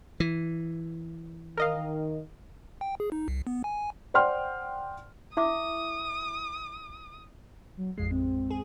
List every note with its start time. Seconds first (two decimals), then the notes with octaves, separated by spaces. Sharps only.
0.20 E3
1.57 D#3 A#4 D#5 F5
2.81 G5
3.00 G#4
3.12 D#4
3.28 C2
3.47 B3
3.64 G#5
4.14 C5 D5 F#5 G5 C6 F6
5.37 E4 E5 D6 D#6
7.77 F#3
7.98 A1 F2 G#3 C7
8.11 C4
8.50 G#4